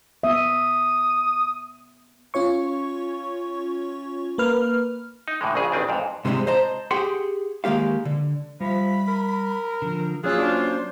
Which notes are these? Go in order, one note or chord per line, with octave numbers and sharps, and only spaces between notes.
B3 E5 D#6
C#4 F4 C#5 C#6
A#3 A#4 B4 F6
D#4
A2 D3 E3 G#3
A#1 C#3 G#4
A1 D#3 C4 D4
F2 G#2
G#2 C3 E3 F3 G3 G#3
C5 D#5 A5 A#5
G4 G#4 F#5 G5 C6
D#3 G#3 A#3 G4 F5
D3
F3 G3 E5 B5
A#4
D3 F3
F#3 A#3 C#4 F4 G#4 D#6 E6 F#6
D4 C5